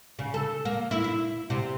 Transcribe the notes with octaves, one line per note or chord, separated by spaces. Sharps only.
C#3
A4
A#3
E4
E4
C3